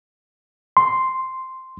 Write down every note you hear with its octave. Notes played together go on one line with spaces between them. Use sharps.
C6